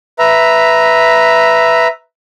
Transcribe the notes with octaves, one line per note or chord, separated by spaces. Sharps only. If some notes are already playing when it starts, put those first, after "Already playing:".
B4 E5 A#5